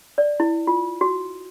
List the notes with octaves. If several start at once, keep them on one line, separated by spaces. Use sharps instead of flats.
D5
E4
F4
F#4